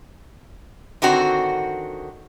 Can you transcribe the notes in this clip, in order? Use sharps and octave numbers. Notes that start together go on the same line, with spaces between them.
D3 D#3 C4 F#4